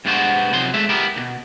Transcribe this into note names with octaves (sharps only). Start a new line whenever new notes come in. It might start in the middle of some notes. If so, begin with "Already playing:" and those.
G2 B2 G#3 B3 F#4 C5
C3 F3 F#3 D#4 C6
G#3 A3 E5
B3 E4 G4 A#4
D2 B2